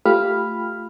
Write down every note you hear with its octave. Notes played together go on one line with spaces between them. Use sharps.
A3 F4 G4 B5 F6